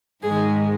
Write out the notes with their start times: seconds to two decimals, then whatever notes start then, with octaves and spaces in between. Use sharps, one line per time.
0.23 G#2 D#3 G#3 G#4